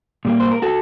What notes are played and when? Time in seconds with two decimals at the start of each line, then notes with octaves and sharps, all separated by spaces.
0.25 A#2 G3 A#3
0.40 C5
0.52 A#4
0.62 F#4 A4